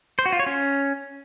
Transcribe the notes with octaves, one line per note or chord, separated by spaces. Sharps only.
C5
F#4
F4
C#5
C#4